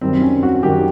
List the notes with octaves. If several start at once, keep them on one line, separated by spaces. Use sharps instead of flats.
F#2 D#3 G3 C4
C#4
F#4
F#2 D#3 G3 G4